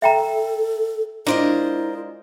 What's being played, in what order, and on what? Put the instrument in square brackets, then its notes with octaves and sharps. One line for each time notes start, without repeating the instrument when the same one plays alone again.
[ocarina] A4 [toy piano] E5 G5 A#5
[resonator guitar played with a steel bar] G#3 D4 F4 [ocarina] E4 [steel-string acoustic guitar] A#4 C5 D#5